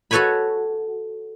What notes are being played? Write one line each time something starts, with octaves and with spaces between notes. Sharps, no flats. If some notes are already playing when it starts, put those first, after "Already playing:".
F#4 A4 B4 C#5 G#5 B5